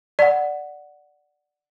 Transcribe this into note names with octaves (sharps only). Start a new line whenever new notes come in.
D5 F#5